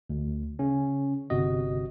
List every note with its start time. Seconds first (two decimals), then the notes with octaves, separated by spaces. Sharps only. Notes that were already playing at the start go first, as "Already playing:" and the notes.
0.10 D2
0.59 C#3 C#4
1.30 G1 C3 F#4 D#5